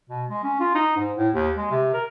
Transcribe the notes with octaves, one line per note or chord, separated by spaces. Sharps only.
B2
G#3
C#4
F4
D#4
G#2
A2
D#2
G#3
C3
A#4